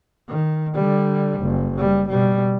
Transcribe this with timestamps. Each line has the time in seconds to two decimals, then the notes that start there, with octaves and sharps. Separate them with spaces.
0.28 D#3
0.74 D3 G3
1.41 F#1
1.78 G3
2.09 B2 G3